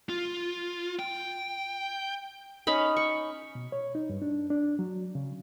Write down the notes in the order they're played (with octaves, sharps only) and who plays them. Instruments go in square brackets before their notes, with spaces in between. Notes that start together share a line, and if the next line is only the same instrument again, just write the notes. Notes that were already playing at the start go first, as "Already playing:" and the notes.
[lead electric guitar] F4
G5
[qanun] C#4 D#4 B5
C#6
[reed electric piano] B2
C#5
D#4
G2
D4
D4
F#3
C#3